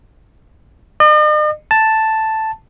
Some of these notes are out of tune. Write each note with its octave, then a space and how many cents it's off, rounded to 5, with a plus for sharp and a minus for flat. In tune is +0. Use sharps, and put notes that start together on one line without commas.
D#5 -45
A5 +0